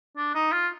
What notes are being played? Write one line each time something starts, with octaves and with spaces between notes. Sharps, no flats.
D4
D#4
F4